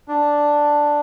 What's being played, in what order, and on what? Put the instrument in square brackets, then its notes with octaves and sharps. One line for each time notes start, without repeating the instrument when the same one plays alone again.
[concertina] D4